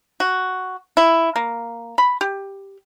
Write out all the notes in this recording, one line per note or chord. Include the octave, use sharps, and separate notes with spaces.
F#4
E4
A#3
B5
G4